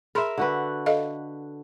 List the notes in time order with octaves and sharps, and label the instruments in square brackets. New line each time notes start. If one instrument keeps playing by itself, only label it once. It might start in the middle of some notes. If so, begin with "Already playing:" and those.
[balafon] G#4 B5 C6 [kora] A#4 E5
[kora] D3 F#4 B4
[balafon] A4 D#5 F5